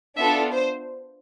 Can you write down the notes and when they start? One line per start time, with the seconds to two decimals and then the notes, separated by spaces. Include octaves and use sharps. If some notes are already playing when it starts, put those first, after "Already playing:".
0.18 B3 D4 F4 A4 E5
0.53 C5